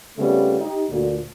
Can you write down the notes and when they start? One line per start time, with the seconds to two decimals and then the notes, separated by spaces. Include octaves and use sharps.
0.18 C#3 G3 A3 B3 C4 F4
0.60 D#4 G4
0.90 D2 A#2